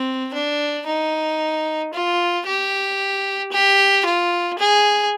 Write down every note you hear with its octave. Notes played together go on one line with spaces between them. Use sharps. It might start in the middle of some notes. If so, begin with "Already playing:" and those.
Already playing: C4
D4
D#4
F4
G4
G4
F4
G#4